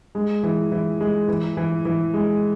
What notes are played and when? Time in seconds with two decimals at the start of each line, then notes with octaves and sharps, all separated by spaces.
0.15 G#3
0.43 E3
0.72 E3
1.00 G#3
1.28 E3
1.57 E3
1.85 E3
2.14 G#3